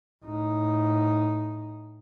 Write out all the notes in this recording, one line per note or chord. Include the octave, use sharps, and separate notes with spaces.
A2 D#4